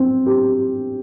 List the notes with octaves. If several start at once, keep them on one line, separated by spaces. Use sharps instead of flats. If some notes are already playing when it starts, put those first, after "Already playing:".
Already playing: C4
G4